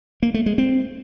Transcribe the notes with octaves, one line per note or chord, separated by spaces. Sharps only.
A#3
A3
G#3
C4